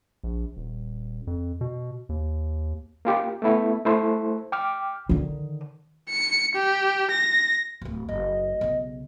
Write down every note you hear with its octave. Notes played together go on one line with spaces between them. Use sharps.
A#1
D#1
F2
B2
D#2
A#3 F4 G4
A3 B3 E4
A3 E4 C5
G5 D6 F6
D3 D#3
C#7
G4
A#6
D1 G1
F#1 D#5
B1 C#3